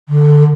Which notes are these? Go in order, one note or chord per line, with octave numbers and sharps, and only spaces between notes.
D3